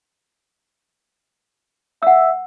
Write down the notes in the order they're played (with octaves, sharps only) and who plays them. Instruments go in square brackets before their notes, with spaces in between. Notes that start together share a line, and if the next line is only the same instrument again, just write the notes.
[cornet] E5 [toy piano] F#5 E6